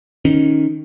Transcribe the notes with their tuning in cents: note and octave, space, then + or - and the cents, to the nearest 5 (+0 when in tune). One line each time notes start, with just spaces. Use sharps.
D#3 +0 C#4 +0